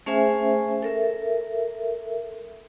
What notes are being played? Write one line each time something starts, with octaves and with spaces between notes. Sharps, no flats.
A3 C#4 G#4 C5 E5 G#5
A4 A#4 E5